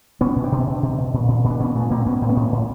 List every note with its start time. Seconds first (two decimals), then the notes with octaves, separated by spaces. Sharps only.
0.21 B2 B3 C#4
0.36 B2
0.44 C4 D4
0.52 B2
0.67 B2
0.83 B2
0.98 B2
1.14 A#2
1.28 A#2
1.44 A#2
1.50 D4
1.59 A#2 B3 C#4
1.75 A#2 A3 B3
1.90 A#2 A#3 C4
2.06 A2 B3 C#4
2.22 A2 C4
2.29 B3 C#4
2.36 A2
2.52 A2